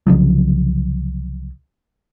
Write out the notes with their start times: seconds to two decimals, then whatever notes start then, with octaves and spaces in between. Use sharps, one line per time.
0.07 C2 C#3 F3 F#3